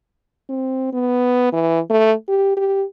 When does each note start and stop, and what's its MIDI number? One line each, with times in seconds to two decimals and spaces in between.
0.49 0.91 60
0.93 1.52 59
1.53 1.80 52
1.90 2.13 57
2.28 2.52 67
2.57 2.84 67